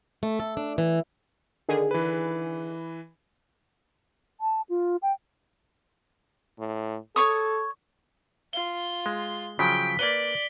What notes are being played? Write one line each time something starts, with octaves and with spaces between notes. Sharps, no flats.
A3
A4
D4
E3
D3 D#3 G#4
E3 B4
A5
F4
G5
A2
A4 C#5 C#6 D#6
F4 G7
G#3
C#3 F3 F#3 G5 B6
A#3 B4 D5 G7